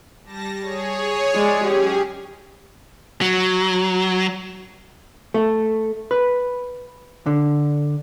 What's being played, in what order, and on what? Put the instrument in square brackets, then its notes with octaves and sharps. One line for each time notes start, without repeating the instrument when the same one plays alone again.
[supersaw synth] G3 A5 A#6
G#4 C#5
[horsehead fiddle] G#3 D5
[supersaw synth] F#3 C#4 G#4 [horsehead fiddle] G4
[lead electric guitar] F#3
[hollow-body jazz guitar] A3
B4
D3